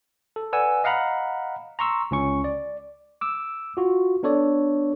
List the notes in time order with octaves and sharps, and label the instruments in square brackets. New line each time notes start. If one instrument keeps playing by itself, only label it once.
[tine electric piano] A4
B4 D5 F#5 G#5 E6
D#5 F5 F#5 A#5 B5
A#5 C6 C#6 E6
C#2 C#4 C#6
D5
D6 E6
F4 F#4
B3 D4 A4 C#5 D5